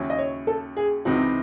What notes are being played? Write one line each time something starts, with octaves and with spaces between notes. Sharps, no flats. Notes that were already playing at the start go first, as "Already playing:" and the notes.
Already playing: D#2 C#3 F#3 C#4 E4
D#5
C#5
A4
G#4
C#2 C3 E3 C4 D#4 F#4